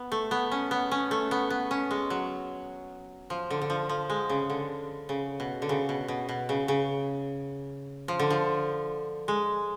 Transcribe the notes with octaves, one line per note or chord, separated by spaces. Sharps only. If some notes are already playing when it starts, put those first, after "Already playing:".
Already playing: B3
A3
B3
C#4
B3
C#4
A3
B3
B3
C#4
G#3
F#3
F3
D3
D3
F3
F3
G#3
C#3
D3
C#3
B2
D3
C#3
B2
B2
B2
C#3
C#3
F3
D3
F3
G#3